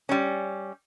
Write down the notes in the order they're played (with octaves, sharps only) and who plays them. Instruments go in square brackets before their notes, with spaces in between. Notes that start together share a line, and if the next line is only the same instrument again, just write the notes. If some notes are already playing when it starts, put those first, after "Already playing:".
[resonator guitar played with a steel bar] G3 C#4